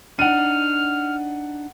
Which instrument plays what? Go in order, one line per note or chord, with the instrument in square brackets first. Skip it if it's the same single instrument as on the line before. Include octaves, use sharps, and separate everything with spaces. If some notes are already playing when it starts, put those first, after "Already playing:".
[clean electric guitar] D4 D#4 [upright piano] F#5 D#7 [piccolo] F6